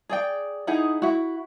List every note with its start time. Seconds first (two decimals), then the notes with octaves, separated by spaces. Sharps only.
0.09 G#4 D5 G5
0.67 D#4 E4 G#4 F#5
1.02 E4 F#4